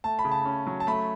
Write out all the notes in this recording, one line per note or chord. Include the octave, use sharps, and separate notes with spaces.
A3 A5
B5
C#3
A5
C#4
F#3
A5
A3 B5